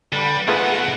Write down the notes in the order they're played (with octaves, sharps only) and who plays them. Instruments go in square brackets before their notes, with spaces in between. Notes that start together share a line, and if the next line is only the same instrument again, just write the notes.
[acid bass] D3 [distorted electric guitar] G3 [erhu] B4
[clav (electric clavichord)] A3 F4 B4 [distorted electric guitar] B3 D#4 [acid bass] G#4 [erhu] F#5